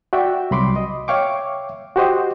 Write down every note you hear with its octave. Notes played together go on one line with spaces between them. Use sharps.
F#4 D5 E5 G5
C2 F#3 B5 C6 D6
D#5
C#5 E5 F5 G5 C#6 D6
F#4 G4 C5 D#5